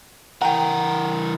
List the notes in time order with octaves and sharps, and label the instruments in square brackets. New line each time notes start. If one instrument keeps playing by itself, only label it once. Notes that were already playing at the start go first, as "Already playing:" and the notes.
[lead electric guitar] E3 A#4 [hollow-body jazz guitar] F#5 G5